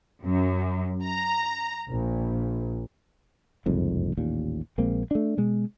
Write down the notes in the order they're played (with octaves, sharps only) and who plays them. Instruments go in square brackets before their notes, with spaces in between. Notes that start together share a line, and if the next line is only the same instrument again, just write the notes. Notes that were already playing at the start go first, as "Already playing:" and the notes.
[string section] F#2
A#5
A#1
[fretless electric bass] F#1 C2 F2 G#2
A1 D#2 A#2
A#1 G#3 A#3 C4
A3 D4
B2 G#3